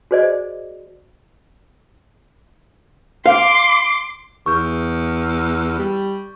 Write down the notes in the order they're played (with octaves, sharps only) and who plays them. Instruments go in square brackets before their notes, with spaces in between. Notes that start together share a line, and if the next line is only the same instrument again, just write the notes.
[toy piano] F#4 G#4 C5 D5 D#5
[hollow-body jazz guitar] F5 [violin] C6 D6
[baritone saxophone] E2 [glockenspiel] C#6 G6
[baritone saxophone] G3